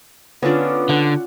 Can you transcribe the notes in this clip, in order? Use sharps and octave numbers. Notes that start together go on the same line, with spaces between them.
D3 B3 C#4 D4 F4 D5
D3 F#5